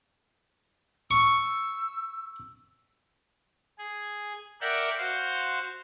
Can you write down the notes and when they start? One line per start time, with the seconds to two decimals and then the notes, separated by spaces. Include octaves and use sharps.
1.11 C#6 E6
3.78 G#4
4.61 A#4 D5 E5 F#5 G5
4.97 F#4 C5 F5 C6